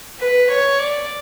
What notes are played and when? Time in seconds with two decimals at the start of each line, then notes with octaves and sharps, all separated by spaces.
0.19 B4
0.50 C#5
0.79 D5